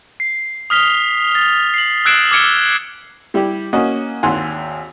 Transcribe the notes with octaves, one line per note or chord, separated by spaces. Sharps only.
C7
D#6 F6 B6 F7 G7
A6
C7 F#7
E6 F#6 G#6 C7 D7 E7
D6 F6 G#6 C#7 D7 G7
G3 E4 G4
A#3 C#4 F#4 D#5
G#1 D#2 F#5 G#5 C6